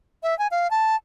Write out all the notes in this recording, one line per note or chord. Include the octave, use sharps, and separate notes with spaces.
E5
G#5
F5
A5